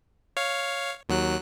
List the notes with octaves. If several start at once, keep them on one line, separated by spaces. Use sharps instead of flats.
C#5 F5
D#2 F#3 F#6